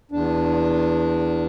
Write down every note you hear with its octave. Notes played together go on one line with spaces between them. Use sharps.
E2 D4